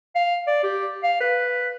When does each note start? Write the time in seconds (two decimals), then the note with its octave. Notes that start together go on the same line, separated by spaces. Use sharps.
0.15 F5
0.47 D5
0.64 G4
1.03 F5
1.20 B4